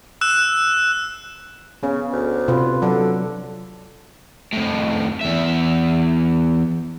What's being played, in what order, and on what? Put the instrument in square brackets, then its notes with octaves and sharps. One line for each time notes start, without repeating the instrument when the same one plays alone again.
[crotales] E6 F#6 E7
[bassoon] C#3 [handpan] B3 C#4
[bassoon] D2
[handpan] C3 F4 B4
[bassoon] D3 [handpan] F#3 A4
[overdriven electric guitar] F2 A2
E2 E5